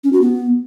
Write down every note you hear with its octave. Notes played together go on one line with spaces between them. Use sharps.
C#4
F#4
B3